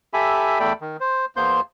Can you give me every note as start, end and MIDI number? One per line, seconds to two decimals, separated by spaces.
0.14 0.59 67
0.14 0.59 69
0.14 0.59 76
0.14 0.59 80
0.14 0.59 83
0.60 0.73 40
0.60 0.73 57
0.60 0.73 69
0.60 0.73 74
0.60 0.73 79
0.60 0.73 83
0.81 0.97 51
1.00 1.25 72
1.36 1.61 40
1.36 1.61 58
1.36 1.61 59
1.36 1.61 72
1.36 1.61 84
1.36 1.61 91